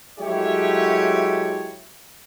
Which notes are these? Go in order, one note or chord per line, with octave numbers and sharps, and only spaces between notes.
F#3 G#3 A3 E4 G4 C#5